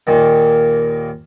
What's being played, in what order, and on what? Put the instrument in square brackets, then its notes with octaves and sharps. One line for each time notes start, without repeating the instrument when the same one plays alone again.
[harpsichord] D#2 A#2 D#3